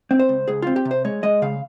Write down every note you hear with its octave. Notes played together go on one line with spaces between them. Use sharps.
C4
C5
C#2
C#2 G#4
C4 F4
G4
C3
C5
G#3 C#5
G#3 D#5
C#3 F5